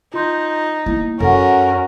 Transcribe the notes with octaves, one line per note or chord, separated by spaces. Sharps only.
D#4 F4 C6 G6
A#3 B3 E4
F#2 C#4 F#4 A4 A#4 F#5